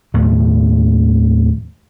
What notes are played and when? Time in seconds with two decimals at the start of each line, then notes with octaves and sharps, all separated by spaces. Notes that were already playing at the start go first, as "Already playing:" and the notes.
0.14 D#2 A2 D#3 F3